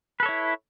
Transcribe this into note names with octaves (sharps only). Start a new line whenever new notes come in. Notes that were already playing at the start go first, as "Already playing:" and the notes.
E4 A4 B4 C#5